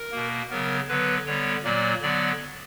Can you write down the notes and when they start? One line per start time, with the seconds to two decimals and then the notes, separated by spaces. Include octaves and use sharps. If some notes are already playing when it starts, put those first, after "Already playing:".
Already playing: A#4
0.11 B2 A#3
0.50 C#3 F#3 B3 A#4
0.88 D3 F#3 B3 B4
1.26 D3 G3 B3 C#5
1.64 A#2 F#3 A#3 D5
2.02 D3 F#3 B3 D5